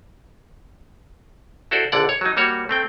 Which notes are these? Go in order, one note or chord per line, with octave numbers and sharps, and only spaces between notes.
E4 F#4 A4 C5 D5
A#1 D3 D5 F#5
C#5
F#3 D#4
G3 A#3 F#4 C#5
A3 C4 G5